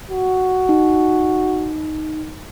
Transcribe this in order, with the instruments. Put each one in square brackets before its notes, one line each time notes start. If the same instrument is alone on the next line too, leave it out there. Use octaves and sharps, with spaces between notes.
[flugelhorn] F#4
[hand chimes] D#4